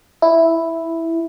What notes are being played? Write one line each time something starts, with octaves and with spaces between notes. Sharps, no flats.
E4